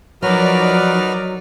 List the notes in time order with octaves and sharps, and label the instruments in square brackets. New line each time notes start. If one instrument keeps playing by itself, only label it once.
[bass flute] F3 [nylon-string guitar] F#3 [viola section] D#4 A#4 D5 [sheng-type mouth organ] F#4 B4 F6